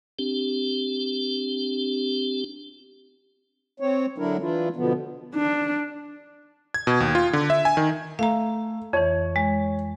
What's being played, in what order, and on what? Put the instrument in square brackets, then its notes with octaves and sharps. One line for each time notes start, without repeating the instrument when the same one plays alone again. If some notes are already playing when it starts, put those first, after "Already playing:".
[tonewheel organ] C4 D4 G4
[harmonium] C4 C#5
D3 F#3 D4 E4 A#4
E3 D4 E4 F4
B2 D3 F3 B3
[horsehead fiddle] D4
[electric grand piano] G#6
B2
D#2
F4
D3
E5
G#5
D#3
[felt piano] A3 [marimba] F5 A#5
[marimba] F2 E3 [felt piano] C#5
[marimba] G#3